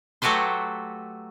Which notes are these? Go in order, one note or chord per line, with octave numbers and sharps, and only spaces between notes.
F#3 A3 F#4 G4 B4 C5